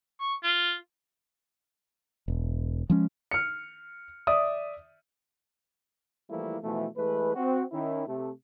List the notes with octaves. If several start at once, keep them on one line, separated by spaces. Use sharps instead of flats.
C#6
F4
E1
F3 G#3 C#4
F6 C#7
D5 E5 D#6
E3 F3 G3 A3 A#3 E4
B2 E3 F3 A3
E3 G#3 A3 B4
C4 F#4
D#3 C#4 E4
C3 A3